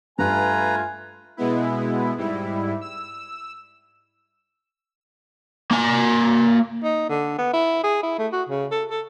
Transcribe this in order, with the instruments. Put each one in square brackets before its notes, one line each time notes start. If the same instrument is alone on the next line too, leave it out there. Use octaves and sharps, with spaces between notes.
[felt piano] G2 [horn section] A3 F4 [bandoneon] B4 A#5 [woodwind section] G#5
[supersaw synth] B2 G#3 B3 E4
G#2 G3 E4
E6
[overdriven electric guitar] A#3 G#5
[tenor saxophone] D#4
D3
B3
E4
G#4
E4
A3
F#4
C#3
A4
A4